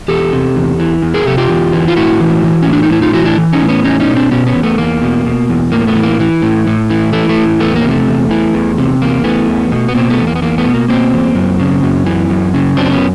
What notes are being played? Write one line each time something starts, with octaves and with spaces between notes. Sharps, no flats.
E2 G4 A4
C3
E2
E3
E2
G#4 A#4
C3 G4 A4
F4 G4
E2
E3
F4
A2 E4 F#4
E3
E3
A2 C#4
D4
D#4
A2 E4
D#4 F4
E3 E4 F#4
D4 E4
E3
C#4 D#4
A2
B3 C#4
E2 C#4 D#4
C#4 D#4
B2
C4 D4
B2 B3 C#4
B3 C#4
E2
A3 B3
E2 A#3
B2
B2
E2
A2 A#3
A3 B3
E3
A#3
E3
A2
A2
E3
E3 A3
A3
A2
E2 A3 B3
A#3
C3
A3
E2
E3
E2
C3
E2 A#3
E3 A3 B3
E2
B2
B3
B2 A#3 C4
A3 B3
E2
A#3
B3
E2 A#3
A3 B3
B2
A#3
B2 A#3 C4
E2
F#2
C#3
F#2
E3
F#2
C#3
F#2 C4 D4
B3 C#4